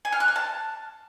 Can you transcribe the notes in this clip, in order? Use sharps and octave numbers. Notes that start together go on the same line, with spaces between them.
G#5
F6
F#6
F6
A5